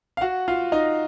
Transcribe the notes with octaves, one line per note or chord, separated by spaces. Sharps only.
F5
F#4 F#5
F4 F5
D#4 D#5